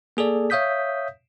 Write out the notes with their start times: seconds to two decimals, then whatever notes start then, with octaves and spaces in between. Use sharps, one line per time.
0.17 A#3 G#4 A4 D5
0.50 C#5 E5 F5 D#6 G6 B6